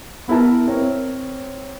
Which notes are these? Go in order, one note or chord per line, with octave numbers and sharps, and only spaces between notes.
B3 E4 A#4 A5
C4 A#4 C#5